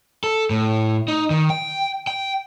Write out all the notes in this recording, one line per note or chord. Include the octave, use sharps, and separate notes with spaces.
A4
A2
D#4
D#3
G5
G5